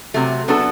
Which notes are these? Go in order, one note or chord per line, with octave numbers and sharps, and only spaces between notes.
C3 F#3 A3
F#3 B3 D4 A4